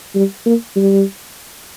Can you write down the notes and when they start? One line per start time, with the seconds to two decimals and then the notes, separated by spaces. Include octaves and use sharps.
0.15 G3
0.46 A#3
0.76 G3